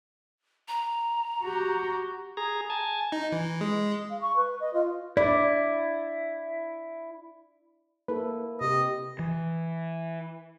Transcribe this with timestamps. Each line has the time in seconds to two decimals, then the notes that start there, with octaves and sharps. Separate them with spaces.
0.68 A#5
1.43 F#4 G4
2.37 G#4 A#5
2.70 G#5 A5
3.12 D#4
3.32 E3
3.61 G#3
4.10 F5
4.21 C#6
4.36 B4
4.60 D#5
4.73 F4
5.17 E4 D5
8.08 A#3 E4 A4 B4
8.61 C3 G4 D#5
9.19 E3